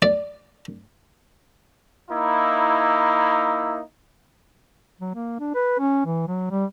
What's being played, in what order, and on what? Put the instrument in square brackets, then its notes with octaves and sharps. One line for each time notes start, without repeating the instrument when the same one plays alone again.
[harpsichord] D5
[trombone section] A#3 D#4 E4
[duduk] F#3
A#3
D4
B4
C#4
E3
F#3
G3